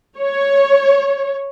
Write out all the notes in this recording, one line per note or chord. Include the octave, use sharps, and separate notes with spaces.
C#5